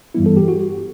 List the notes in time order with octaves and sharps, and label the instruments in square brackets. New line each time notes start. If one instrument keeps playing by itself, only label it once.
[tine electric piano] G2 E3 G3 B3 E4
A4
G4
F#4